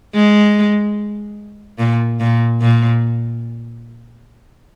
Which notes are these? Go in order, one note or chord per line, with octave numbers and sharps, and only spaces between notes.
G#3
A#2
A#2
A#2